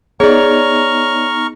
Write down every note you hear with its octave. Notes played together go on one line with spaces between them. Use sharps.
B3 D#4 G#4 C#5 D5 A#5 C#6 F6